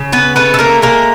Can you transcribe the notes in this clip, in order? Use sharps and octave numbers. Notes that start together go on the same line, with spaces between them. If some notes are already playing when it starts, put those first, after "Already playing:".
Already playing: C#3
B3 B4
A3 B3 B4
A4
A#3 A#4
G#3 A#3 A#4